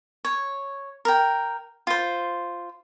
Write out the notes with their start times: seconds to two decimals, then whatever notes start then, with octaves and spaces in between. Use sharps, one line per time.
0.25 C#5
1.05 A#4 G5
1.87 F4 C5